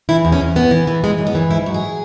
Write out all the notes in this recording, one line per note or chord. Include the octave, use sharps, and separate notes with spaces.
E3 E4
E2
C#4
E2
E3 B3
E3
E3
E3 G#3
F#2
B3
E3
G#2 E4
F#3
G#4